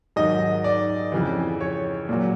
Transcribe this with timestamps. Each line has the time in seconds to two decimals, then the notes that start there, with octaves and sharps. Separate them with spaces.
0.16 G#2 D#3 F#3 D#5
0.64 D5
1.12 F2 C#3 E3
1.61 C#5
2.09 A#2 F#3